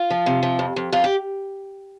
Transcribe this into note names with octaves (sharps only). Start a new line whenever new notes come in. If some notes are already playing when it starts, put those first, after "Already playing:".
Already playing: F4
F3
C3
F3
F2
F2
F2 F4
G4